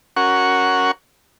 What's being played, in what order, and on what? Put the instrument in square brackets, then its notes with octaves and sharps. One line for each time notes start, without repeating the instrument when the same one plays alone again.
[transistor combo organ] C#4 F#4 A#4 F#5 C#6